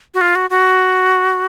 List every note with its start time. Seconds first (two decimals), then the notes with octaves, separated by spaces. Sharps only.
0.14 F#4
0.21 F4
0.35 F#4
0.50 F#4